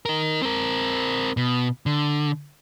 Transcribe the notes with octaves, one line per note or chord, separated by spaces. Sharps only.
D#4 A#4
C4 A#4
B2
D3